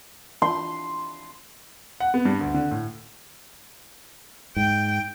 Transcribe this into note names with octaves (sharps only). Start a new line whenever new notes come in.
C6
F#5
B3
G2
D2
D3
A2
G#2 G5